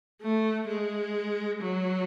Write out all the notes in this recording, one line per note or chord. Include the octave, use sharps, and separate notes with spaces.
A3
G#3
F#3